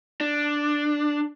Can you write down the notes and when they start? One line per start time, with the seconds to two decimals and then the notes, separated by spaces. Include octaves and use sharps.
0.21 D4